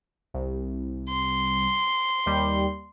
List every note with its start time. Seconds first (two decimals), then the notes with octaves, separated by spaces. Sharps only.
0.34 C2
1.09 C6
2.26 D#2 G3